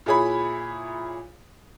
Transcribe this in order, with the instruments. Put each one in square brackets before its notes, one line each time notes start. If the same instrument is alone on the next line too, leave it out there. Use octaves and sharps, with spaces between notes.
[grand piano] A#2 E4 G#4 C#5 B5